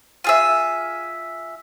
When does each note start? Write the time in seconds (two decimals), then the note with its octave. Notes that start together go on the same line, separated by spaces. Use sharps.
0.24 F4 G#4 E5